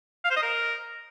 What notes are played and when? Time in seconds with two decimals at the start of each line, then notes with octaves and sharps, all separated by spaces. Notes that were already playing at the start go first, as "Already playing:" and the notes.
0.24 F5
0.30 C5
0.36 D#5
0.42 A#4